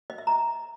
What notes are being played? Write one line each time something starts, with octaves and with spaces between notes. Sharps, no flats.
D#5
E5
A#5